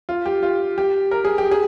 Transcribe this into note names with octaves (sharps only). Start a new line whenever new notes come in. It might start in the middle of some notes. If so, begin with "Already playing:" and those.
F4
G4
F4
G4
A#4
G#4
G4
G#4